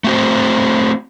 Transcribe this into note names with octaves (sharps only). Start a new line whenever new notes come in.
A3 C4 F#4 C5